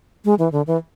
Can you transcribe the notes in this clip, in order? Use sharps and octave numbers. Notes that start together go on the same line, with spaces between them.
G#3
E3
D3
E3